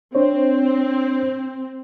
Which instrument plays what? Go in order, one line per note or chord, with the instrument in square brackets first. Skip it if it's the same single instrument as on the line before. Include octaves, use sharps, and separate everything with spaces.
[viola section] C4 [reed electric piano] D4 C5 C#5